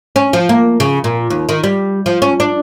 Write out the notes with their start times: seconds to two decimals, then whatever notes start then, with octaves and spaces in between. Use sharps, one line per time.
0.16 C#4
0.33 F3
0.49 A#3
0.80 C#3
1.04 A#2
1.30 D#2
1.49 D#3
1.64 G3
2.06 F3
2.22 C#4
2.40 D4